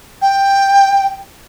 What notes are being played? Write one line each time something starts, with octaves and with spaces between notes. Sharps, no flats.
G5